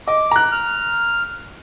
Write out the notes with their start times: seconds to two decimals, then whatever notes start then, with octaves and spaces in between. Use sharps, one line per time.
0.08 D#5 D6
0.31 A#5 F#6
0.52 F6